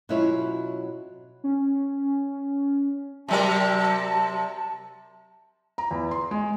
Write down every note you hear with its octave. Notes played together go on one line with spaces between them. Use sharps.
B2 F#3 C#4 E4 F4 C#5
C#4
C3 F#3 A#4 A5
A#5
E2
C6
G#3